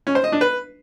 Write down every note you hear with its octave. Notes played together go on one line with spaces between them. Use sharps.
C#4
C5
D#5
D4
B4